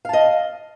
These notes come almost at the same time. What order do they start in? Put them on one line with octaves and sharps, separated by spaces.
F5 A5 D#5